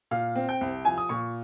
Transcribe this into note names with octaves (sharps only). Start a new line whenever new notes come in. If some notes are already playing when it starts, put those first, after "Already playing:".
A#2 F5
C4
G5
C2
F3 G#5
D#6
A#2 C#6